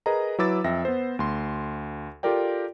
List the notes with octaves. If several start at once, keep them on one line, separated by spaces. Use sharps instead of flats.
G#4 A#4 B4 D#5 A#5
F#3 E4 B4 D6 E6 A6
F2 E5 G5 A#6
B3 C5
D2 C6
F4 G4 A4 A#4 D5 G5